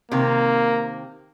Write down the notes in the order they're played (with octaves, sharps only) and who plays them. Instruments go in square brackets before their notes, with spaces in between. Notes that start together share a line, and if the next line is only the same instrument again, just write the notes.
[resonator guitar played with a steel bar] C3 D#3 C4 [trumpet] A#3